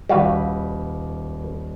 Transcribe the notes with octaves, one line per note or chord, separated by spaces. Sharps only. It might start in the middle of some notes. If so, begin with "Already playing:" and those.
D#1 G3 F#4 B4 F5 B6